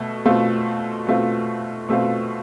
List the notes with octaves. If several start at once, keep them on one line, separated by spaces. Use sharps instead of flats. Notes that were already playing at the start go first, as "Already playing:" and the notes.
Already playing: B2 A3
B2 A3 C4 F4
B2 A3 C4 F4
B2 A3 C4 F4